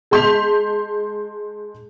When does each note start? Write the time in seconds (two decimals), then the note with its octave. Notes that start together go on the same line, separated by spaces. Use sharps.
0.11 G#3 A5 C6 G6 B6 F7